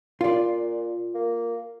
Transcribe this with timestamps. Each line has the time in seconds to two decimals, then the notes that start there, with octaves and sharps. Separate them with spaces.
0.21 A#2 F4 D5
1.15 A#3